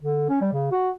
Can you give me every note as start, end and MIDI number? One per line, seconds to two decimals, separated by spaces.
0.02 0.28 50
0.29 0.37 61
0.41 0.49 55
0.53 0.71 49
0.72 0.90 66